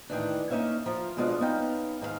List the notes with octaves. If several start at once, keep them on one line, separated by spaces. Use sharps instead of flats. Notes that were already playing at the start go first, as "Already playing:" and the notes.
A2 D#3 E3 D4
A#3 C#4 D#4 C#5 E5 F5
F3 F4 A#4
B2 F3 G#3 D4 F5
B3 C#4 D#4 F5 G5
G#2 D#3 A4 F5